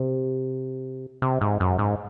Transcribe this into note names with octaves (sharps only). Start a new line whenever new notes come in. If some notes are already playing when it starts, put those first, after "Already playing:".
Already playing: C3
C3
G#2
F#2
G#2